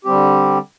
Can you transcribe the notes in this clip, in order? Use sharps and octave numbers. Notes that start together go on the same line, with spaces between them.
D3 G3 C4 G4